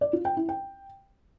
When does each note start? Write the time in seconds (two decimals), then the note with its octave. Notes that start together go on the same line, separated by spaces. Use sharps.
0.01 D5
0.13 F4
0.25 G5
0.37 E4
0.49 G5